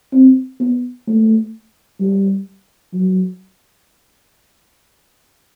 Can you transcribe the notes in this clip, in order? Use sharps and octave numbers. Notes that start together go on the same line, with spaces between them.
C4
B3
A3
G3
F#3